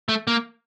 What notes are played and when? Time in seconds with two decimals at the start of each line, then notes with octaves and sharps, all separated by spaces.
0.09 A3
0.27 A#3